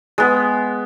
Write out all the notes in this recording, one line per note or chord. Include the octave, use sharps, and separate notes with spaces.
G#3 B3